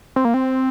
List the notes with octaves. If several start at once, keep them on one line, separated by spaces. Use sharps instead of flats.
C4
A#3
C4